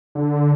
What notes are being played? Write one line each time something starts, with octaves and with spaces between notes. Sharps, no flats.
D3